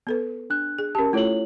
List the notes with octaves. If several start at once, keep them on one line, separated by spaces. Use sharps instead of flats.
B3 A4 B4
D4 F#6
G#4
C#4 G4 A#4 A5
A3 E4 F4 A4 C#5 F#7